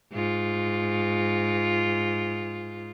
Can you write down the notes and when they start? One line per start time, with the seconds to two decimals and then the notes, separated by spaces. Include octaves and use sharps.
0.13 G#2 F4